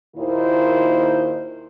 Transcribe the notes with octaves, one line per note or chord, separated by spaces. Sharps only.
D#2 A#2 D#3 E4 F4 C5